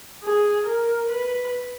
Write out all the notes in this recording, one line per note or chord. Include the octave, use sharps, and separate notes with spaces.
G#4
A#4
B4